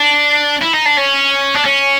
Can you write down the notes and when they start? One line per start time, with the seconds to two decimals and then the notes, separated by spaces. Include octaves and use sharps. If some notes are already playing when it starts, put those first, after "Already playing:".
Already playing: D4
0.62 E4
0.73 D#4
0.85 D4
0.97 C#4
1.54 D4
1.65 C#4